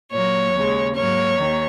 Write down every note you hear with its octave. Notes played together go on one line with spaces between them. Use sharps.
A#2 F#3 A#3 C#5
D#2 C#3 G#3
G#2 F#3 A#3 C#5
D#2 D#3